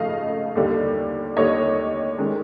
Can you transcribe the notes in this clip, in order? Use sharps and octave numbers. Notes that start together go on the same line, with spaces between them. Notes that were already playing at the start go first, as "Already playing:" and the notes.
Already playing: C#3 F3 A3 D#5 F5
D#2 D3 G3
D#2 D3 G3 C#5 D#5
D#3 G#3 C#4